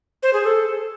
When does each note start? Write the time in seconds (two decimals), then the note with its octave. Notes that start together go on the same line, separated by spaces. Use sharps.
0.23 C5
0.33 G#4
0.44 A4